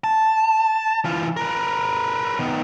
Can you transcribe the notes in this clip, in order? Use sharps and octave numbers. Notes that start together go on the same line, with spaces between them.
A5
E3 F4
A#4 B4
D#3 B3